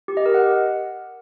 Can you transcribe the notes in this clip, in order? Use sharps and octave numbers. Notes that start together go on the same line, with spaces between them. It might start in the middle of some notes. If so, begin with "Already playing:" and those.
G4
D#5
A#4
F#5